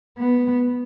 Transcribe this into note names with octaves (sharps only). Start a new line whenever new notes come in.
B3